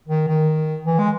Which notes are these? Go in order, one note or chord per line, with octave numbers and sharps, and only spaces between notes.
D#3
D#3
E3
G#3